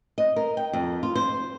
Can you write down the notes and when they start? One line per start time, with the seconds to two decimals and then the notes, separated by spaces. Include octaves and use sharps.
0.18 D#5
0.36 A#4
0.57 G5
0.73 F2
1.03 F4
1.15 C5